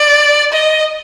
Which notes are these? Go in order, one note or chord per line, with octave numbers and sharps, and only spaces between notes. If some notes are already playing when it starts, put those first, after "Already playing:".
Already playing: D5
D#5